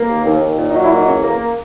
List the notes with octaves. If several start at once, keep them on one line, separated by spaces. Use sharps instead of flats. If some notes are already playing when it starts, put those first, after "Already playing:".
Already playing: A#3
D#2
D#2
D#2
A#2
D#4
F#3
E4
A#3 D#4
E2 C#4
A#3